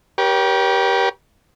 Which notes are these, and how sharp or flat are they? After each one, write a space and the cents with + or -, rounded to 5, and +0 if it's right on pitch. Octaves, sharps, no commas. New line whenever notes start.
G4 -5 A#4 +45 C#5 +15